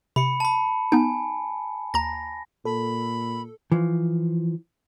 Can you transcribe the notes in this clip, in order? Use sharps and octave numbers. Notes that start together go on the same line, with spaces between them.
C3 B5 C#7
A5 B5
B3 D#4 G#5
D#2 A#5 A#6
A#2 A4 B5
E3 F3